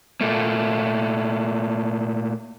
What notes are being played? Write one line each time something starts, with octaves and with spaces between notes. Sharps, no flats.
A#2 A3 A#3